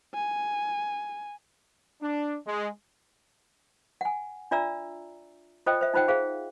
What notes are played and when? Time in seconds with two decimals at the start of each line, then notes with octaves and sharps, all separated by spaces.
0.15 G#5
2.02 D4
2.46 G#3
4.01 F#5 G#5
4.51 D4 F4 D5 E5 A#5 E6
5.66 F4 A4 C5 D#5 G5
5.81 C5 E5
5.94 D#4 F4 C5 F#5 G5
6.08 G#4 C5 F5